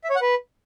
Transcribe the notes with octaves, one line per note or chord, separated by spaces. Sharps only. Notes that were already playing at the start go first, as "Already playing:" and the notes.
E5
C#5
F#5
B4